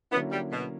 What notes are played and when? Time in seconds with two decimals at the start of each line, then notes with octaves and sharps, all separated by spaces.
0.11 D3 F#3 A#3 B3 C#4 E4
0.31 G3
0.51 B2